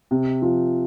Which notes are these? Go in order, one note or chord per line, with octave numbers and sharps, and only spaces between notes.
C3
F3